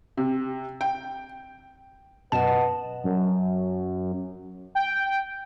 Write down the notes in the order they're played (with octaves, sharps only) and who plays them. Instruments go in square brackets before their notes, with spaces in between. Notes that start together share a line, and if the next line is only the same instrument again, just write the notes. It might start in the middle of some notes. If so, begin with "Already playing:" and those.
[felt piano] C3
G5
[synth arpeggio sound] F#2 B2 E7 [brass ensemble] B4 D#5 F#5 [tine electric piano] A5
[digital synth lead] F#2
G5